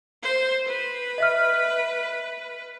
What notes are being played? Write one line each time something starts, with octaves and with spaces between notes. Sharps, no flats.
C5
B4
D#5 E5 F6